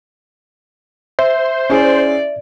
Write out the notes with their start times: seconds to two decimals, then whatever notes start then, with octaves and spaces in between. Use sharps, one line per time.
1.19 C5 E5
1.70 C#4 E4 G#4 D5